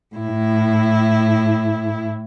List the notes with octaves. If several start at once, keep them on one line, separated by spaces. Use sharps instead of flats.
A2 E4